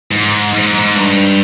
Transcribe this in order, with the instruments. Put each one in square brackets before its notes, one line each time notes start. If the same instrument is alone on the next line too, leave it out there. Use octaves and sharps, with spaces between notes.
[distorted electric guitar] G#2
G#2
G#2
G2